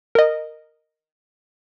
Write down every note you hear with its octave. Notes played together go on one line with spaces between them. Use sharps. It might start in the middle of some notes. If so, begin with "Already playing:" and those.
A#4 D#5